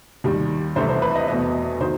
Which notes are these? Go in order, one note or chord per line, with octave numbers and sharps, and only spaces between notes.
D#2 D#3 G3
C2 C3 E3 A3 C5
C5
B4
D#5
E2 B2 A3 D#5
D#3 F#3 C5